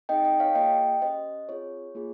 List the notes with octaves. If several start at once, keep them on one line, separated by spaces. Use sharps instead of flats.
C4 D#4 G#4 D#5 G5
D#5 G5
C#5 F5
A#3 F4 G#4 D#5 G5
C#4 G4 C5 D#5
C4 F4 G#4 C#5
A#3 F4 G#4